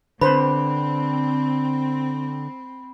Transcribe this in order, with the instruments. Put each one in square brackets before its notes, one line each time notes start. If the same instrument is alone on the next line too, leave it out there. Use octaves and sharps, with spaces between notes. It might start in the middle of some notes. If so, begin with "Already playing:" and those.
[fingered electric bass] D3 [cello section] C4 [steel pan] B4 C5 [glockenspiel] B5